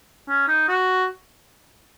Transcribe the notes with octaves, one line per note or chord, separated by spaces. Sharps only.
C#4
D#4
F#4